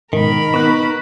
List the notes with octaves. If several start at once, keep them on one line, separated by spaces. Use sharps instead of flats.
G#2 B2 D#3 A#4 B5
B3 D#4 C#6 F#6